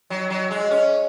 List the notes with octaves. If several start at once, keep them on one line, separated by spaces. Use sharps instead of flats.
F#3
F#3
G#3
C#4